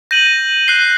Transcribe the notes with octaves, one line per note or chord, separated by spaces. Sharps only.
G6 A#6 D#7 F#7
F#6 C7 G7